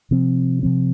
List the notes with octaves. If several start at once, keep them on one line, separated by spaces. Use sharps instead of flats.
C3 F3 C4
C3 F3 C4